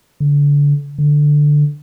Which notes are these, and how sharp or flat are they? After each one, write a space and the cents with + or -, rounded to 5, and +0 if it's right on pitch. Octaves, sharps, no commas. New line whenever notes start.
D3 -30
D3 +5